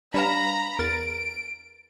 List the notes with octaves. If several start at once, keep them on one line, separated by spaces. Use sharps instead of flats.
G3 D4 B4 C#5 F5 A#5 B5 E7
E2 A#4 A6 D7